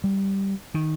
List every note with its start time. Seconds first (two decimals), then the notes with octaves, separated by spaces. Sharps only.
0.04 G3
0.74 D#3